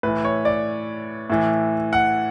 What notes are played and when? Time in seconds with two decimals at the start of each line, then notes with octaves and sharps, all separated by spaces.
0.03 A2 E3 B4
0.25 C#5
0.45 D5
1.30 A2 E3
1.93 F#5